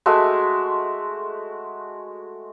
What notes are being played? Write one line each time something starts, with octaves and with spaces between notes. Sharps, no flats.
G#3 A3 F#4 E5